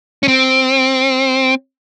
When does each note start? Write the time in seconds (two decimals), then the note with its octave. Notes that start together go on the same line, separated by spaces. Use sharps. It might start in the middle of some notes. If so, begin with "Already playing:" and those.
0.23 C#4
0.28 C4